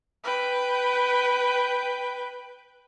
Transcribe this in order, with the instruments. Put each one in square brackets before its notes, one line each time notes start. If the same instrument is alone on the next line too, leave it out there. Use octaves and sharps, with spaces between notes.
[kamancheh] B4 G5